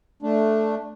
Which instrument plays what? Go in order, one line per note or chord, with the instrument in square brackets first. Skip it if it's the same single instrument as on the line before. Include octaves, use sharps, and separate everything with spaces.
[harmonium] A3 D4